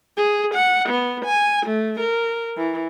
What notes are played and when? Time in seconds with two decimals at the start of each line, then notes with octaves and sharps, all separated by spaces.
0.17 G#4
0.54 F#5
0.89 B3
1.25 G#5
1.66 A3
2.00 A#4
2.57 E3